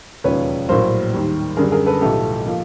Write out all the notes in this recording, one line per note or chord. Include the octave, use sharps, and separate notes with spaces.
E1 D#2 C#3 F3 B4 C#5
A#1 A2 F#3 A#3 A#4 C5
D#2 D#3 G3
F#2 D3 G3 G#4 A#4
G#4 A#4
A4 B4
B1 A2 F3 A3 G4 A4
F3 A#3